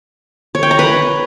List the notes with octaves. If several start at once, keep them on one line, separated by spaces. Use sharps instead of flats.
C#5
G5
A#5
B4